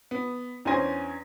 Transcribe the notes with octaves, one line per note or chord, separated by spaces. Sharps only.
B3
E2 C#4 D4 C5 G#5 A#6